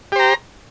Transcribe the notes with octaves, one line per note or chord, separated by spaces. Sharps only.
G4 C5 A#5